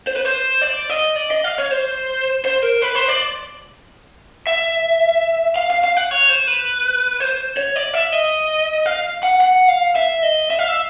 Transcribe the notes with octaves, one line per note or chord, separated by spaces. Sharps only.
C5
B4
C5
D5
D#5
D5
D#5
F5
C#5
C5
C5
A#4
B4
C5
D5
E5
F5
F5
F5
F#5
C#5
C5
B4
C5
C#5
D5
E5
D#5
F5
F#5
F#5
F5
E5
D#5
E5
F5
E5